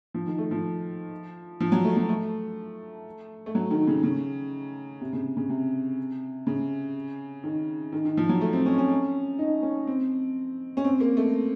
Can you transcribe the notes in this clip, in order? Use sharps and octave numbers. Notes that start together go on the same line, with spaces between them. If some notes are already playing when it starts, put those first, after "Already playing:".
F3
D#3
A3
F3
F3
F#3
A3
F#3
A3
A3
F#3
D#3
C#3
C#3
C3
C#3
C#3
C3
C#3
D#3
D#3
D#3
F3
F#3
A3
C4
C#4
C#4
D#4
C#4
C4
C#4
C4
A#3
A3